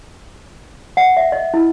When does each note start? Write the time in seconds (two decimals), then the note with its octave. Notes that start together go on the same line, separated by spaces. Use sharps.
0.97 F#5
1.17 E5
1.32 D#5
1.54 E4